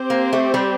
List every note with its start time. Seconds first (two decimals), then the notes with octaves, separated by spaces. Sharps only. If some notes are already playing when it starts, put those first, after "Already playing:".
Already playing: C4 G4 C5
0.10 A#3
0.33 A3
0.54 G3